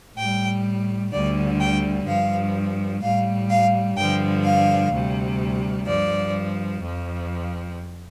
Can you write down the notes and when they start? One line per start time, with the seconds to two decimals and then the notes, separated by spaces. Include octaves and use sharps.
0.17 A2 G3 G5
1.12 D2 D3 G3 D5
1.60 G5
2.07 G2 F3 F5
3.02 A2 G3 F5
3.50 F5
3.97 G2 D3 F3 G5
4.44 F5
4.92 D2 C3 G3
5.87 G2 F3 D5
6.81 F2
6.87 F3